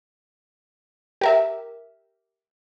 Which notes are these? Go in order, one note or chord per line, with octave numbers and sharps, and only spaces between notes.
G4 A#4 E5